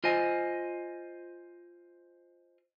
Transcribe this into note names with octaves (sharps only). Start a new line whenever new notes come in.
F4 C5 D#5 G#5